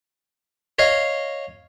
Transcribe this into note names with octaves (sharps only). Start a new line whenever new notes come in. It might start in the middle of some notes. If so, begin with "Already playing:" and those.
C#5 D#5 F5